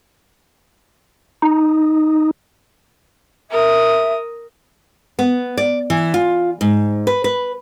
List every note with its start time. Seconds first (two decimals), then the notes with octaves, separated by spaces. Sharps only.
1.42 D#4
3.51 A#4 E5 D#6
5.19 B3
5.57 D5
5.90 E3
6.14 F4
6.61 G#2
7.07 B4
7.24 B4